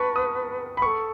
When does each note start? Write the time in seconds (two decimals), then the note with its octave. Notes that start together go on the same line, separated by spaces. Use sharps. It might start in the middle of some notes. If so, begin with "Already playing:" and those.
Already playing: B4 A5 C#6
0.16 D#6
0.77 B5
0.82 A4 B4 C#6